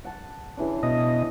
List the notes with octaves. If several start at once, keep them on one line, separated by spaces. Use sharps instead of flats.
F#5 A5
C#3 E3 D4
B2 D#5